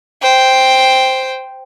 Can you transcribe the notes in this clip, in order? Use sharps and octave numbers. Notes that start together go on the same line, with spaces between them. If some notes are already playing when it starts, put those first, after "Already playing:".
C5 G5